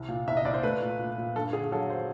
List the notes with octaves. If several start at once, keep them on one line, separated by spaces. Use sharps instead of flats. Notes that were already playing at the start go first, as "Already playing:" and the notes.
Already playing: C2
A#2
C2 E5
D#5
C2 D5
C5
A3 B4
A#2
A#2
A#2
G2 A4
D3 G#4
F#3 A4
C5